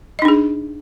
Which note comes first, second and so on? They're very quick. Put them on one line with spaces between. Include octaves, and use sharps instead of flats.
D#5 D#4 D4 G#4